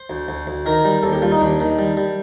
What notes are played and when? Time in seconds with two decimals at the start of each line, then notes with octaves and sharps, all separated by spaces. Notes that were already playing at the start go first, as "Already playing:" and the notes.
Already playing: C5
0.10 D2
0.29 D2
0.47 D2
0.66 D#3 A#4
0.85 G3
1.03 D#2 A4
1.13 G4
1.22 G3 F4
1.32 D#4
1.41 D#2 D4
1.60 D#3
1.79 G3
1.97 G3